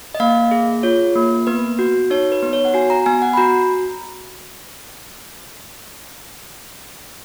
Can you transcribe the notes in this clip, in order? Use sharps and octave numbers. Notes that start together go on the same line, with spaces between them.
D#5
A#3 F5
G#4
F4 C#5
A#3
B3 B4
F#4
D#4 C#5
B4
B3
C#5
F#5
F#4 G#5
A#5
B3 G#5
F#5
B5
F#4 A#5